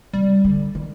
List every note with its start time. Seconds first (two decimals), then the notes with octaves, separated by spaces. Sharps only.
0.13 C3 G3
0.44 D3
0.75 D#3